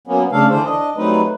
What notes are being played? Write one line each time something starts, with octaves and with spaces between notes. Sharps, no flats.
F#3 A#3 B3 C#4
C#3 A3 D4 A4 F5
D3 E3 D4 C5
D4 D#5
F#3 G3 A3 C4 D#4 B4